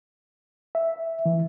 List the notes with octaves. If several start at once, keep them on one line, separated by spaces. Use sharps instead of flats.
E5
E3